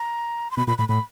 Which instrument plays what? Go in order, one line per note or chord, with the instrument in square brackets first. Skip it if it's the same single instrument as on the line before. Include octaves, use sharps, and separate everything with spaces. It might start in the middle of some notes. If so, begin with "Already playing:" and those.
Already playing: [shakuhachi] A#5
C6
[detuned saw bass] B2 [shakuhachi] B5
[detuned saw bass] A#2 [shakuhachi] B5
[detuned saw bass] A2 [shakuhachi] B5
[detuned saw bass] A2 [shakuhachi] B5